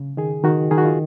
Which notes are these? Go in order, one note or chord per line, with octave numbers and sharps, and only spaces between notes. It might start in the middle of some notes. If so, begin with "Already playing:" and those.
Already playing: C#3
D#3 G#4
D#3 F#4
D#3 G#4
F#4
F4